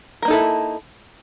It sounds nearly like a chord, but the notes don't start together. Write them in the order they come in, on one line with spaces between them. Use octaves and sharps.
A#4 A#3 D#4 A4 E4